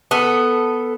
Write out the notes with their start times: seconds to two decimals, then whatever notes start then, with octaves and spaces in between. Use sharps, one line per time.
0.11 B3 A4